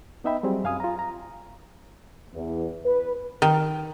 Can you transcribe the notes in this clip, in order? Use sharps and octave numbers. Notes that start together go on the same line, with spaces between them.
B3 D#4 D#5 E5 G5 B5
F#3 G3 C4 G#4
F#2 F5 G#5 D#6
F4 A#5
A#5
E2
B4
D#3